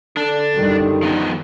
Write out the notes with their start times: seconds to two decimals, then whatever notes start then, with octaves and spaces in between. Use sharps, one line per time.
0.17 D3 D4
0.56 F#2 D#3 G3
1.02 F3 B3 D#4